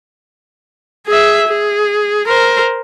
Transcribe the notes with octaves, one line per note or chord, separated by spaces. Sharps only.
G#4 E5
G#4
A#4 C5